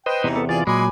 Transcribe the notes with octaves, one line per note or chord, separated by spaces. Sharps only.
B4 C5 D#5 G5
E2 C3 E3 D#4
B3 A4
E3 F4 G#4 D5
A#2 F#3 G#3 G#5 B5 D6